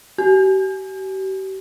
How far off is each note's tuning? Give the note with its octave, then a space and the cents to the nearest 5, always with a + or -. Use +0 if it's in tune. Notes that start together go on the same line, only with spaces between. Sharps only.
G4 -40